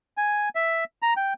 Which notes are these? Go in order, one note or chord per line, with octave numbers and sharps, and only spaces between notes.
G#5
E5
A#5
G5